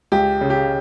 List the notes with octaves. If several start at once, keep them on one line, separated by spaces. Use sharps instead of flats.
C#2 G4
C#3
G4